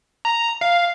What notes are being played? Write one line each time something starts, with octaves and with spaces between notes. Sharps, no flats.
A#5
F5